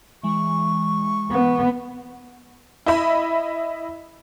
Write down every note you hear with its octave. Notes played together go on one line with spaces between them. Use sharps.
E3 G#3 C#6
B3
E4 D#5 E5 B5